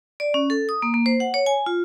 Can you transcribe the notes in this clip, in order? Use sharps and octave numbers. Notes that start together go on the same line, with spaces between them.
D5
C#4
A4
D#6
A#3
A#3
C5
F#5
C#5
G#5
F4